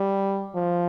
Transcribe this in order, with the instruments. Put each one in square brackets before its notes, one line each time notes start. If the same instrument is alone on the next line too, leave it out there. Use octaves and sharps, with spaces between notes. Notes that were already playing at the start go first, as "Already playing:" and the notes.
Already playing: [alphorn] G3
F3